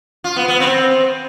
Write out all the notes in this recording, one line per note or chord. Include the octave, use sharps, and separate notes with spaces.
F4
B3
B3
C4